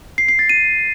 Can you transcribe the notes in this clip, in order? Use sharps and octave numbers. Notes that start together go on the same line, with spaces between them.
C7
C7
A6
D#7